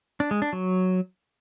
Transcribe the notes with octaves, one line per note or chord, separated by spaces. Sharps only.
D4
G#3
D4
F#3